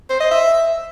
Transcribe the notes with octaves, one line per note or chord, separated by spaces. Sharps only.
C5
D#5
E5